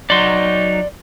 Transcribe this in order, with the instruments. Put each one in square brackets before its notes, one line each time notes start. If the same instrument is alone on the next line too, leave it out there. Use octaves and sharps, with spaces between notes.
[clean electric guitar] F#3 D#4 [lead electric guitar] D5 C6